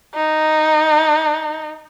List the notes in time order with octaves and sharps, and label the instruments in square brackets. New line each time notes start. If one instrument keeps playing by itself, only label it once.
[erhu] D#4